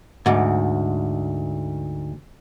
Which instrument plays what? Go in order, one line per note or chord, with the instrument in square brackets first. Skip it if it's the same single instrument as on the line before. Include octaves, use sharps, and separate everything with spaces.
[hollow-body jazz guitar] D2 G#2